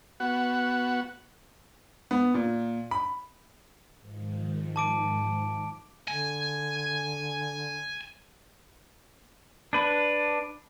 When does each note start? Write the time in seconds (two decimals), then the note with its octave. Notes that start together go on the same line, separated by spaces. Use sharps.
0.20 B3 F#4 F#5
2.11 B3
2.34 A#2
2.91 B5
3.99 G#2 D#3 F3
4.76 A5 D6 D7
6.08 D3 G#5
9.73 D4 B4